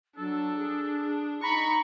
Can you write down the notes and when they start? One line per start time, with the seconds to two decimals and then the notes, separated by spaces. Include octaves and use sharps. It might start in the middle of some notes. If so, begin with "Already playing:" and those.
0.17 F#3 D4 A4
0.56 G#4
1.43 D#4 A#5 B5 C#6